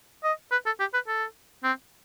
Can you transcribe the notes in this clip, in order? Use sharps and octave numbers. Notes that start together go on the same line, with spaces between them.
D#5
B4
A4
G4
B4
A4
C4